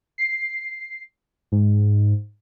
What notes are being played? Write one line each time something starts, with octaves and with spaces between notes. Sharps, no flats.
C7
G#2